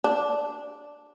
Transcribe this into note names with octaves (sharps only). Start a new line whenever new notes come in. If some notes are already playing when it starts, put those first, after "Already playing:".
D4